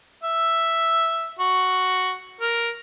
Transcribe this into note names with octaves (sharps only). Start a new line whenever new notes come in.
E5
F#4
A#4